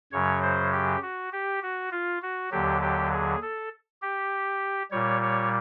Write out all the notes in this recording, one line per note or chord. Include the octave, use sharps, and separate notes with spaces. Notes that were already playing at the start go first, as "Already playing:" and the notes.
F#2 C#3 F#3 C#5
C5
G4
F#4
G4
F#4
F4
F#4
D#2 D3 F#3 G4
G4
G#4
A4
G4
A#2 G3 C#5
C#5